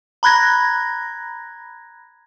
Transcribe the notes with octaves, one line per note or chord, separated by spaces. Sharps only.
A#5 B5 F#6 G#6 A#6